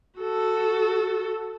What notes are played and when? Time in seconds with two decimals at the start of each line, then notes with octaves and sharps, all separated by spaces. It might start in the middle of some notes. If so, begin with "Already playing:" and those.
0.19 F#4 A4